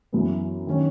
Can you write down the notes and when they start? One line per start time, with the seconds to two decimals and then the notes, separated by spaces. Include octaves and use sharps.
0.13 F#2 E3 B3
0.67 D#3 F#3 C#4